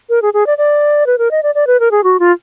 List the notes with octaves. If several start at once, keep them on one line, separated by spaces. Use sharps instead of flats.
A#4
G#4
G#4
D5
D5
B4
A#4
D#5
D5
D5
B4
A#4
G#4
F#4
F4